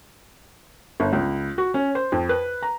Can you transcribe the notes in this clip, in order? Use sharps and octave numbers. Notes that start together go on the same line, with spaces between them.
G1
C#2
F#4
C#4
C5
F2
B4
A#5